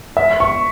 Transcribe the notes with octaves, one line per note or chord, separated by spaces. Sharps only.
E5
C#6